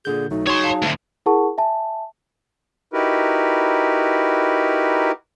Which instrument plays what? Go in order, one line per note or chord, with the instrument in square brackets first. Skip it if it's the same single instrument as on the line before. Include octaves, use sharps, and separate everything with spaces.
[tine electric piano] A#2 D3 G6 [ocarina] G#4
[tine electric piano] B1 F#3 A3 [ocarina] D#4
[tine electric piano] F#3 G#4 [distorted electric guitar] C#5 C6 [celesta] C#6 G#6
[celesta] F5 A5
[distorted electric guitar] D2 A2
[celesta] E4 G#4 A#4 F#5 A5 C#6
E5 G#5 A5
[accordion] D#4 E4 F#4 G4 A#4 B4